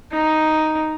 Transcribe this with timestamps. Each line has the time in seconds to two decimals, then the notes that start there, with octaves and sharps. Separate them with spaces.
0.12 D#4